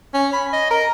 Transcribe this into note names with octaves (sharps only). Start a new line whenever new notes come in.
C#4
B5
D#5
A#4